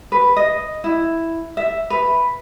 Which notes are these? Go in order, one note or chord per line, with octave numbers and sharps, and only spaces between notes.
B4
D#5
E4
E5
B4